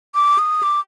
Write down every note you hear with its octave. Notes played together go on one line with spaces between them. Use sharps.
D6
D#6
D6